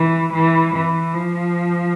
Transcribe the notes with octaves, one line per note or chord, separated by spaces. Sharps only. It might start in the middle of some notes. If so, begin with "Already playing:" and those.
Already playing: E3
E3
E3
F3